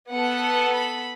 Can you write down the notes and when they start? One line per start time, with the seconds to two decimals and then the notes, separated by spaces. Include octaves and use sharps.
0.11 B3 A4 F#5
0.73 B5